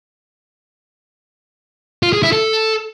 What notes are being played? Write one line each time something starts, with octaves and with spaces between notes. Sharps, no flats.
F4
G#4
E4
A4